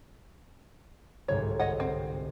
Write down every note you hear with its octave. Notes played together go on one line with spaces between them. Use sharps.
G1 C2 G#2 C#5
C#5 D#5 F#5
C4